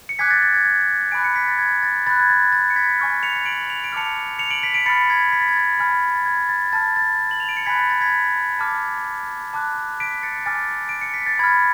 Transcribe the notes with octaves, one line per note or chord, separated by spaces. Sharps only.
C#7
G#5 D6 F#6 G#6 B6
A6
A6
G#6
G#6
G#5 B5 D6 F#6 D7
C#7
B6
A6
G#6
A6
B5 F#6 A6
G#6
A6
A6
C#7
G#6 B6
G#5 C#6 F6
C#7 F7
F7
D7 F#7
F7
D7
A5 D6 F6 C#7 F7
C#7 F7
D7 F#7
B6 D7
B6 D7
B5 F6 A6 C#7
G#6 B6
B6
A6
G#6
A6
G#5 B5 F6
A6
G#6
A6
A5 F6 A6
A6
F#7
F7
D7
C#7
G#5 B5 F#6 G#6 B6
A6
A6
G#6 B6
A5 D6 F6
A5 D6 F#6
B6 D7
A6 C#7
G#5 D6 F6 A6
D7
C#7
B6
A6
B5 F6 G#6